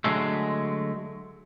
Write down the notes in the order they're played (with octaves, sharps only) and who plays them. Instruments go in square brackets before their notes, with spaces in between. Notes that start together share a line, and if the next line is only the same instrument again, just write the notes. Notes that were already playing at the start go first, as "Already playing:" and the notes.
[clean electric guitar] D3 F#3 G#3 A3